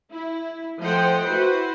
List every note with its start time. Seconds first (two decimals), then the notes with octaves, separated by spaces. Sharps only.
0.12 E4
0.80 F3 A3 C5 D#5 F#5 G5
1.26 E4 F#4 B4 C5